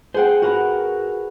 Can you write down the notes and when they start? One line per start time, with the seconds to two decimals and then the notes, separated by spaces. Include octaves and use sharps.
0.14 G#4 C5 F#5 G5
0.42 F#4 A#4 B4 F#5